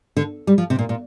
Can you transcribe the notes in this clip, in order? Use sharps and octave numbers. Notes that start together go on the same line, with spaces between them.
D3
G3
F3
C3
A#2
A#2